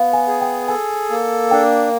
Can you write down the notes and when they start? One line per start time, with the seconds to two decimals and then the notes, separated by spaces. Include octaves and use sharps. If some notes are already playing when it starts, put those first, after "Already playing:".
Already playing: B3 F5
0.13 G#5
0.28 G#4
0.41 G5
0.68 A4 G#5
1.10 A#3
1.51 D4 G5